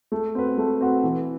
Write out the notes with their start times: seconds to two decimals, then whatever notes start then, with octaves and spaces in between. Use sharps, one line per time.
0.12 A3
0.35 C4 F#4 B4
0.58 A3
0.81 C4 F#4 B4
1.03 E3